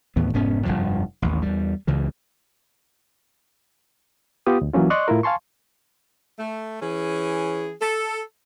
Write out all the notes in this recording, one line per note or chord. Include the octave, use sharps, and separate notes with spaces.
D#2 A2 E3 B3
F1 G#2 B3 C#4
F1 C#2 G2 F3
A1 D#2
E2 G3
C#2 C#3 E3
B3 F4 G4 D#6
D2
E3 F#3 A#3 C#4 F4
D5 D#5 C6 C#6 F#6
A2 E4 F4 A#4
F5 G#5 A5 C6 C#6
A3
E3 C#4 G#4
A4